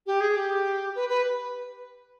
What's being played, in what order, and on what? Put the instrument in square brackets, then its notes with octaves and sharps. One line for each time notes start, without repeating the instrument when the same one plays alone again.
[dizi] G4
G#4
G4
B4
B4